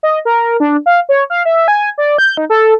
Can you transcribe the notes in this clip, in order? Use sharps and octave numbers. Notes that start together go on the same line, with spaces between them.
D#5
A#4
D4
F5
C#5
F5
E5
G#5
D5
G6
D#4
A4